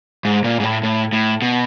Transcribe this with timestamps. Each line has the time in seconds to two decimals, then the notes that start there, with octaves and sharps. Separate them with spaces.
0.25 G#2
0.44 A#2
0.60 G#2
0.63 A2
0.83 A2
1.13 A2
1.42 B2